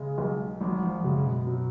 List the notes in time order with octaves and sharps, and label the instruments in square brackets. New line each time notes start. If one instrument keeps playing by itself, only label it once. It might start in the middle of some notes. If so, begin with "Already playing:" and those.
Already playing: [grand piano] C#3 [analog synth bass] G#3
[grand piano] B1
[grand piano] G#1 [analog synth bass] F#3
[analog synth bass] F3
[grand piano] F#2 [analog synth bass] C#3
[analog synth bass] C#3
B2
[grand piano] F#3